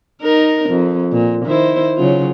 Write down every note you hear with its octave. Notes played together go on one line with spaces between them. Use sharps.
D#4 A#4
F2
A#2
D#3 E4 C5
C#3 F#3 F4